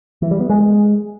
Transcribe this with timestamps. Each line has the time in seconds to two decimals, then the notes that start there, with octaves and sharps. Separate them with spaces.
0.22 E3
0.31 G3
0.40 B3
0.50 G#3